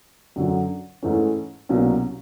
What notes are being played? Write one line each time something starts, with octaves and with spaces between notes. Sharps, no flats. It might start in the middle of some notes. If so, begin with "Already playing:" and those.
F#2 D3 F#3
G#2 E3 A3 C#4
C2 B2 F#3 A#3 C#4